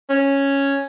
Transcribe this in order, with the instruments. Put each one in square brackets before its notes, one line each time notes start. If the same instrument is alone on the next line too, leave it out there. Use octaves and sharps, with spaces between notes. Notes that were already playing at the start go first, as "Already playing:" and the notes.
[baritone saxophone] C#4